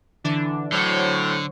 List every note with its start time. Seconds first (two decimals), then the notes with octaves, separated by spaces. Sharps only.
0.24 D3 E3 D4
0.72 A2 D3 F#3 C5 C#5